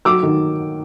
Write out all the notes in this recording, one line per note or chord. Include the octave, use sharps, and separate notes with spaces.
F#3 D6 E6
D#3